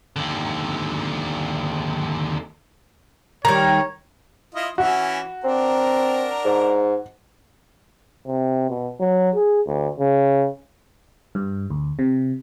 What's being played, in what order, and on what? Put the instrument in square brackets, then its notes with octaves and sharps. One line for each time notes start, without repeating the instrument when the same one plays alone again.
[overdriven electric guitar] D#2 D3
[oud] D#3 G3 [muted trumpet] C#5 [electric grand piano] A#5
[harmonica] E4 F4 D#5
[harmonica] E3 C#4 E4 [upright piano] F#4
[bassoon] C4 [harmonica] D4 A#4 A#5
[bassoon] G#2
[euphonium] C3
B2
F#3
G#4
D2
C#3
[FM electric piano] G2
D2
C3